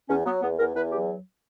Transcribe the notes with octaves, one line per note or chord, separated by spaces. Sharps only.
E2 C#4
F#3 B3
E2 B3
E2 A#4
E2 B4
F#3 G4